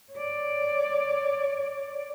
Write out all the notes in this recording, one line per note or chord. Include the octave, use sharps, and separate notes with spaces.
C#5 D5